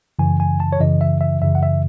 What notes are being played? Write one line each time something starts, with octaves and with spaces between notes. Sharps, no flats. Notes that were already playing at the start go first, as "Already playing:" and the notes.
F#2 C#3 E3 G#5
G#5
A5
C#5
F#2 C#3 E3 D#5
E5
E5
F#2 C#3 E3 E5
F#5
E5